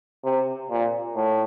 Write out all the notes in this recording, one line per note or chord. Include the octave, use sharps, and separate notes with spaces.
C3
A#2
A2